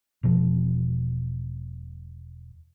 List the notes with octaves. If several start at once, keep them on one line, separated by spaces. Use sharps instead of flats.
E1 B2 F3